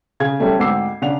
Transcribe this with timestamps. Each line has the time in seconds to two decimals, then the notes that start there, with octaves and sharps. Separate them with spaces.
0.20 C#3 G#4 G#6
0.39 F#3 G3 A3 C#4
0.59 D2 G#2 C4 D6 E6 C7
1.02 C#3 D4 F#5 F7